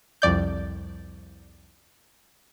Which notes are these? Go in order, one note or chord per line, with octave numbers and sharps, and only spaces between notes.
C2 F2 D5 G6